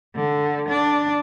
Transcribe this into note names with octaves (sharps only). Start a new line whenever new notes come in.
D3
D4